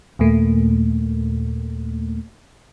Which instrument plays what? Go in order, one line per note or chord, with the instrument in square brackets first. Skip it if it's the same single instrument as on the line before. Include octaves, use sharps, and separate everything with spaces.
[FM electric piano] D#2 A#2 A3 A#3